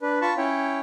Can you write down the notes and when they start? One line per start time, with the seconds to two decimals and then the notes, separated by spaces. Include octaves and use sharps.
0.01 D4 B4
0.21 F4 A5 B5 C#6
0.37 C#4 E4 C#5 G5